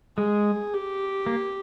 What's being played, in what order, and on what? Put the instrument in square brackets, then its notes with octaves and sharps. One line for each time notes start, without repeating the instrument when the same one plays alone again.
[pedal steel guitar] G#3 [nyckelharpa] G#4
[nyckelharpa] G4
[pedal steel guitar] A#3